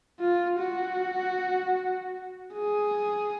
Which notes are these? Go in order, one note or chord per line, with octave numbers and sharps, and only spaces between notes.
F4
F#4
G#4